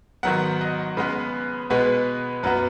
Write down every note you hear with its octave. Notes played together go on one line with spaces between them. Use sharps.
G#2 D#3 F#3 B3 F#5
D#5
C#3 G#3 B3 B4
B2 G#3 B3 B4
F#2 F#3 B3 B4